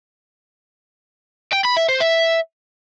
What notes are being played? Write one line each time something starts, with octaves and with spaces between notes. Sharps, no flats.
G5
B5
E5
C5
E5